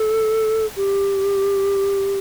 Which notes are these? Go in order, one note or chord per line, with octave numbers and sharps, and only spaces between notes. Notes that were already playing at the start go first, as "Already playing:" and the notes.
Already playing: A4
G4